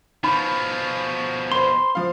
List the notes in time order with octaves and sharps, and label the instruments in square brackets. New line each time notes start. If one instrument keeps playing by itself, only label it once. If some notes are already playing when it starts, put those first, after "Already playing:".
[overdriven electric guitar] B2 F3 [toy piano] D#4 B5
[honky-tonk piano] C5 B5 [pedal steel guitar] C6
[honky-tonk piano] F3 F5